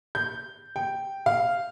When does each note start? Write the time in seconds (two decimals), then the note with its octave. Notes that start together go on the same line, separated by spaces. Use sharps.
0.15 G6
0.76 G5
1.26 F5